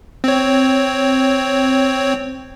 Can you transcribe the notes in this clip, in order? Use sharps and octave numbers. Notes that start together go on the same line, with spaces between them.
C4 C#5